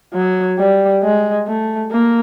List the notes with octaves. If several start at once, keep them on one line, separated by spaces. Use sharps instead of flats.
F#3
G3
G#3
A3
A#3